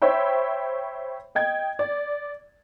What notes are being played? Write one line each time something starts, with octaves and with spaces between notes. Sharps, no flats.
C5 C#5 E5 G5 B5
D#5 G5 G#6
D5